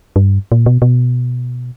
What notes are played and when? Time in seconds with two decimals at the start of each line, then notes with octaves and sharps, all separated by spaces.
0.16 G2
0.52 A#2
0.66 B2
0.82 B2